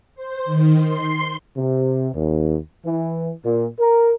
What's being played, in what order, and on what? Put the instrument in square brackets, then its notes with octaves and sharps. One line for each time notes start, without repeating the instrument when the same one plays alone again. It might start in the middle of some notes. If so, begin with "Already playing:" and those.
[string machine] C5
D#3
C6
[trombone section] C3
D#2
E3
A#2
A#4